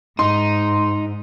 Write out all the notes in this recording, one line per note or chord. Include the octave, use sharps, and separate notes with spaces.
G#2 D#4 C6